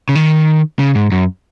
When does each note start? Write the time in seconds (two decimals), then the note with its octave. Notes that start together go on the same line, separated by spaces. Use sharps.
0.09 C#3
0.15 D#3
0.79 C#3
0.95 G#2
1.12 F#2